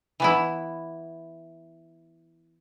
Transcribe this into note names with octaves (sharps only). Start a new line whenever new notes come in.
E3 B3 E4